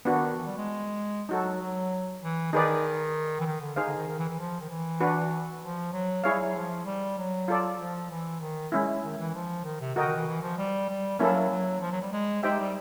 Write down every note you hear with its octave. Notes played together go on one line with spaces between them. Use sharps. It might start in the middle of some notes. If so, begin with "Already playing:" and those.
D#3 B3 D4 F#4
E3
G3
G#3
F#3 D#4 F#4 A4
F#3
E3
D#3 D#4 G#4 B4 D5
E3
D#3
D3
D#4 G#4 C5 F5
D3
D#3
D#3
E3
E3
F3
D#3
E3
D4 F#4 B4
F3
F#3
G3 E4 G#4 C#5 F5
F#3
F3
G3
F#3
F4 A4 D5
F3
E3
D#3
G#3 C#4 E4
D#3
E3
F3
D#3
C3
D3 F#4 A#4 D#5 G5
D#3
E3
E3
F3
G3
G3
F#3 A#3 C#4 E4 A4
F#3
F3
F#3
G3
G#3
G#3 D#4 G4 C5 E5 G5
G3